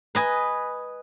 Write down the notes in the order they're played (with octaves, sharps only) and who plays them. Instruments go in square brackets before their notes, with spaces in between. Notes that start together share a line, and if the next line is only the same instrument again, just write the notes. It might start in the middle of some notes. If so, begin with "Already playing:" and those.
[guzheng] B4 D#5 G#5